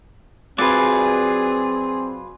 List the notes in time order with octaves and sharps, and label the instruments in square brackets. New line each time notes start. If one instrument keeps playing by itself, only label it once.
[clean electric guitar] F#3 F4 B4 [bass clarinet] C4 [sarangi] G#4 [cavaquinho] D5